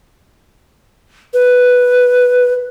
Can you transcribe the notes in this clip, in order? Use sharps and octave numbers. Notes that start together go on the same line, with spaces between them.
B4